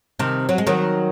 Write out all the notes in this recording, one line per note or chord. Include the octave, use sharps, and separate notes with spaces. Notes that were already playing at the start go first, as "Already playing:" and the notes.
C3 D#3
F#3
G#3
D#3 F#3